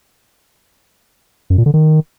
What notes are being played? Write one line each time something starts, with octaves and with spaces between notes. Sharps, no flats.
F#2
A#2
D3
D#3